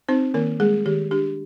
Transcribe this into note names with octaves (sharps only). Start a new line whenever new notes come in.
C4 D#4 C5
D#3 A#3 A#4
G3 G#3 G#4
D#3 G4
D4 G4